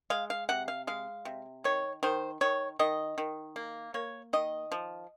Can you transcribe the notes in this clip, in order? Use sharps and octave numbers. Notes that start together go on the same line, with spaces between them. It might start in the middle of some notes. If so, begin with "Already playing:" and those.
G#3 F5
F5
C3 F#5
F5
G#3 F5
C3
D#3 C#5
D#3 C5
D#3 C#5
D#3 D#5
D#3
A#3
A#3 C#5
D#3 D#5
F3